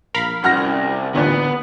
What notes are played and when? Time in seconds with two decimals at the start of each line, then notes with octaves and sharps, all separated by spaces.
0.14 A#1 A#4 F5 B5
0.44 C2 F#2 C#4 F#5 F6 A#6
1.15 A1 D#2 A#2 D3 B3